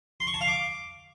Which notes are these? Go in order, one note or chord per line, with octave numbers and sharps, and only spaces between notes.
C6
C#6
A5
F5
D6